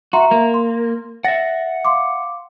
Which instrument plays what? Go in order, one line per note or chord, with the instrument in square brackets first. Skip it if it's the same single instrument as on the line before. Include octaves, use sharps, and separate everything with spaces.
[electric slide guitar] F#4 [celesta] E5 A#5 C6
[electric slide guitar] A#3
[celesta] C6
[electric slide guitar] E5 F#5 [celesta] A6 A#6
[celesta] F5 C6 D6